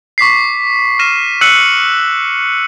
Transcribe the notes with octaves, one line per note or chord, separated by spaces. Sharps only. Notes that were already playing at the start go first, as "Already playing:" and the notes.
C#6 D6 B6 C7
F6 A#6 D#7 E7
E6 F#6 C7 C#7 D#7 F#7